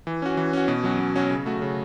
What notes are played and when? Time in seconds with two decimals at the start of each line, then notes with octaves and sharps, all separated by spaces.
0.07 E3
0.22 C#4 F#4
0.37 E3
0.53 C#4 F#4
0.68 B2
0.84 F#3 C#4 F#4
1.00 B2
1.16 F#3 C#4 F#4
1.31 C#3
1.46 A3 F#4
1.62 C#3